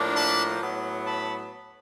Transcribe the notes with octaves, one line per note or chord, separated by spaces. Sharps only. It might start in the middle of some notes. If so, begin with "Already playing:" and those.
Already playing: A2 F3 A#3 D4
A5 B5
A2 F#3 B3
A5 B5